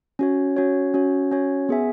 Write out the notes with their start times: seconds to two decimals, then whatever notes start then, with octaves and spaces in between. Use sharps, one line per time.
0.19 C#4 F#4 C#5
0.57 C#4 F#4 C#5
0.94 C#4 F#4 C#5
1.31 C#4 F#4 C#5
1.69 B3 G#4 E5 G#5